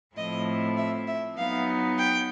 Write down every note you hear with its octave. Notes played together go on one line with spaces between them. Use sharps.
A2 F3 A3 C4 E4 D#5
E5
E5
F#3 B3 D#4 F5
G5